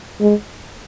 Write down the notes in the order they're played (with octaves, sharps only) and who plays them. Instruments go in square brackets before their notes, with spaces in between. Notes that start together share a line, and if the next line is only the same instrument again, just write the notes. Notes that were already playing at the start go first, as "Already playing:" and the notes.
[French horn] G#3